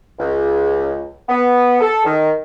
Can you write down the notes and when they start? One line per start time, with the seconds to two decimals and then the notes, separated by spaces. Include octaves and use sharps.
0.19 C#2
1.29 B3
1.81 A4
2.05 D#3